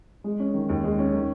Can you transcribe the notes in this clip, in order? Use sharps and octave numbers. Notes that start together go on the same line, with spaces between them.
G#3
C#4
D#3
D#2
G#3
C#4
D#3